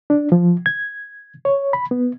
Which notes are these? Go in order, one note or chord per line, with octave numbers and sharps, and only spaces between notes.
D4
F3
G#6
C#5
B5
B3